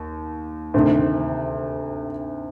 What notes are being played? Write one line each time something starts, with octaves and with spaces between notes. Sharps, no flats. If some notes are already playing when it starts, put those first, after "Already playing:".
Already playing: D#2
D2 C3 D#3